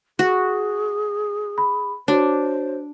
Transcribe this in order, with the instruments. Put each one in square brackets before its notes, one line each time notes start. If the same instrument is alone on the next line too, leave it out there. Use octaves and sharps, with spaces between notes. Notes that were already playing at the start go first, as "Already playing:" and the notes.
[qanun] F#4 [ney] G#4
[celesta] B5
[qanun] D4 [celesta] F#4 C#5 [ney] C5